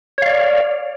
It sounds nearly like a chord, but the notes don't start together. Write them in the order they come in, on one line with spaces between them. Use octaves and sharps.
C#5 F5 D5